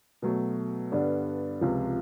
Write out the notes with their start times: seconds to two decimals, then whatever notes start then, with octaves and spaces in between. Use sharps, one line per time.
0.22 B2 F#3 A3
0.92 G2 D3 G3 B3 D4
1.61 C#2 C3 F3